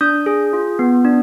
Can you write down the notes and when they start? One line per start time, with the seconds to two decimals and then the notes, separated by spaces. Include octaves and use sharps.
0.01 D4 D#6 G6
0.26 G#4
0.53 F4
0.79 B3
1.05 D4